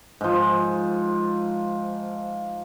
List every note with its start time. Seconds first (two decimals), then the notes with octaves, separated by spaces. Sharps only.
0.21 G#2 F3